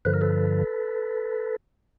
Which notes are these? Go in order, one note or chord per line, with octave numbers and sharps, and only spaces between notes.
G2 D3 F3 B4
A#4
A4 B4